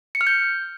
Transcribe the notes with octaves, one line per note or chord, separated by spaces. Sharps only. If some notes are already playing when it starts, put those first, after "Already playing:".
C#7
F6
G6